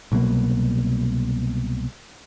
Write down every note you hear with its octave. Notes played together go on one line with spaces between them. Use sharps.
C2 B2 F#3 A#3